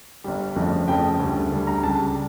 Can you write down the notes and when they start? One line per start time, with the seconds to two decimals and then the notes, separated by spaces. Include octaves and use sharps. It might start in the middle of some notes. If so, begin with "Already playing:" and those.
0.24 G1 G2 D3 G3
0.56 G1 F2 C#3 F3 A3
0.88 G1 F2 C#3 F3 A3 G5
1.20 D2 C#3 G3
1.51 D2 C#3 G3
1.67 A#5
1.83 C#2 C#3 G3 A5